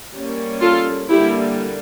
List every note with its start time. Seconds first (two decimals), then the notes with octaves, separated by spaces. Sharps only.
0.14 G3 A#3 C#4
0.62 F4 A4
1.09 D3 G3 A#3 E4 G4